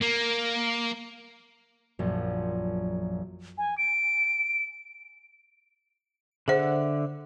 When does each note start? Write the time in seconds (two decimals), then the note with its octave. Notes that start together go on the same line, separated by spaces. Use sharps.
0.01 A#3
1.99 A#1 F#2 F3
3.58 G#5
3.78 D7
6.48 D3 G#4 C5 E5 F#5